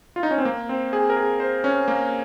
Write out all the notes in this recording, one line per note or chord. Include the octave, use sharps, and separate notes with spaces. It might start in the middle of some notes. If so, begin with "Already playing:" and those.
F4
D#4
C#4
C4
A#3
C4
G#4
A#4
G#4
C5
C#4
A#3